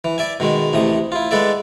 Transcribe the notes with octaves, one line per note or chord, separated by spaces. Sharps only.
E3
D5 E5 G#5
B2 D#3 G#3
A1 A2 C3 D#6
E4 F4
G#3 B3 A4 D5 E5